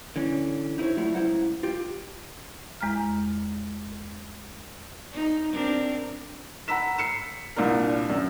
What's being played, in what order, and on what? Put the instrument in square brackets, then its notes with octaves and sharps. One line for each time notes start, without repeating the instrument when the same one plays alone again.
[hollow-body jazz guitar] D3 E3 C#4
D#4 E4 G#4 C5 C#5
F#3 G3 A3 E4 F4
C#2 A#2 E4 C5 F#5 A#5
F4 G4
[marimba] E2 G#3 A#5 F6
[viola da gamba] D#4
C4 D4 A#4
[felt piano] F#5 A#5 B5 E6 B6 E7
C7 C#7 E7
C2 A#2 D4 A#4
F#2